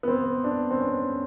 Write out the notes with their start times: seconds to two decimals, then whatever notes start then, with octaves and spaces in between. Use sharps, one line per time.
0.03 B3
0.08 C4
0.44 D4
0.71 C4
0.80 C#4